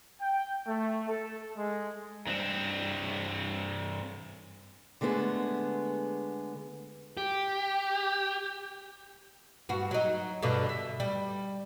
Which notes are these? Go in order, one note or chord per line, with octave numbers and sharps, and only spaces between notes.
G5
A3
A4
G#3
G2 C4
D3 G#3 A3 B3 G#4
G4
G2 F#4
F#3 D#4
G2 B2 D3
E5
G3